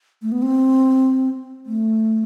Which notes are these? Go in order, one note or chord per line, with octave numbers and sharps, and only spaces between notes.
A3
B3
C4
A3